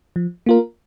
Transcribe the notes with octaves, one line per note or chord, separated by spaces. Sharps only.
F3
A#3 F4 A#4